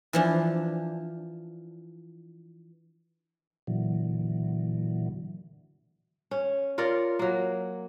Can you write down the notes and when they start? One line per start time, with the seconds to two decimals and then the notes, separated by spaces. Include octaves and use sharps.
0.13 E3 F3 D4
3.67 A#2 D3 E3 F#3
6.31 C#4
6.78 F4 A#4 C#5 D5
7.19 F#3 A#3